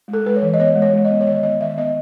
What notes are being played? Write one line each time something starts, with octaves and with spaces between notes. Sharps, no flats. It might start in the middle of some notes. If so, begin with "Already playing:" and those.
G#3
A4
G#3 B4
C#5
E3
D#5
B3 C#5
G#3
C#5
G#3
D#5
B3
C#5
D#3 D#5
B3 D#5
D#3 E5
B3 D#5